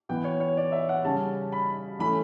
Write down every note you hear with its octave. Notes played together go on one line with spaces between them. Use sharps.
E3 B3 G5
C#5
C#5
D5
E5
F#5
C#3 G3 C#4 A5
B5
E3 A3 C#4 B5